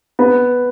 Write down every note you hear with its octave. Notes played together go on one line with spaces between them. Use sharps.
B3